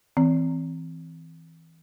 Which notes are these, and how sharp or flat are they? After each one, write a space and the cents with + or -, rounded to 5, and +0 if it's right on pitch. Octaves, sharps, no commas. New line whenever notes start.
E3 -20 C4 -5